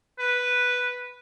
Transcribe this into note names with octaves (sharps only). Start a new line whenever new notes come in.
B4